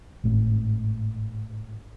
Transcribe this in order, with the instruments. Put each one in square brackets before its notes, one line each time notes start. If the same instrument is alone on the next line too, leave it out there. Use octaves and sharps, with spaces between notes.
[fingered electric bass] G#1 A2